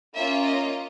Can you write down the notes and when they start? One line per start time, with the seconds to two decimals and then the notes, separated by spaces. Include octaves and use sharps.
0.14 A#3 C#4 F4 E5
0.43 D#5